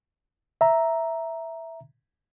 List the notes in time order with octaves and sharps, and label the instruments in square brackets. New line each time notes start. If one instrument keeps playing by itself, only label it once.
[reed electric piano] E5 A#5